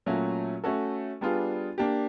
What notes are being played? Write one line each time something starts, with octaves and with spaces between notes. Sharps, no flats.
A#2 F#3 A3 C#4 F#4
A3 C#4 F#4 A4
G3 B3 D4 F4 G#4
A#3 D4 G4